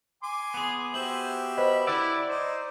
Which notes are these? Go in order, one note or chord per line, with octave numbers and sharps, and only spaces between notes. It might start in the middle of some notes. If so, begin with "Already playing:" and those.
G#5 C6 D6
B3 G#4
F#4 G4 C5 E5 F#7
B4 C5 D#5 B5
E4 D5 F#5 E6
D#4 C5